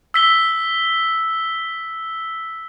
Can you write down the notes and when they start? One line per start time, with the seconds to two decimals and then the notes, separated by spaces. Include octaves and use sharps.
0.14 E6 B6 G7